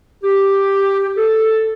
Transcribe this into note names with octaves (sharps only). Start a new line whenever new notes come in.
G4
A4